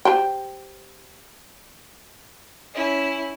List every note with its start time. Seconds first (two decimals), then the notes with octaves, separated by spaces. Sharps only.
0.05 G4 C5 G5
2.74 C#4 E4